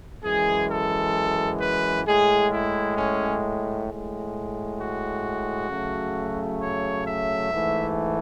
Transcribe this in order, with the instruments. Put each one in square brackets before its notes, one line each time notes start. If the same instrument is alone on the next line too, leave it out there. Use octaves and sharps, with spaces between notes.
[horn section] F#2 E3 G#3 G#4
A4
B4
A2 G#3 G#4
E4
C#4
G#3
A2
F#4
C#3 F#3 A3
C#5
E5
G#2 E3 A3